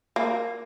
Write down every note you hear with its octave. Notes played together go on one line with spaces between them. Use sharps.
A#3